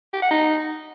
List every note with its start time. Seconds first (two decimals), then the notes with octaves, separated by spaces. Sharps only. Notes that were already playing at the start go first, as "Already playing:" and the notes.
0.13 G4
0.22 F#5
0.31 D#4